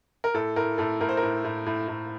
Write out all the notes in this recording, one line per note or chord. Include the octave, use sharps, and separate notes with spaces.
A#4
A2 A4
A2 A#4
A2 A4
A2 A#4
C5
A#4
A2
A2
A2
A2